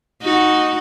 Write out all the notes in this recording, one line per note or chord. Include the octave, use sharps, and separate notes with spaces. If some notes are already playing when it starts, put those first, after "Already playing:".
D#4 F#4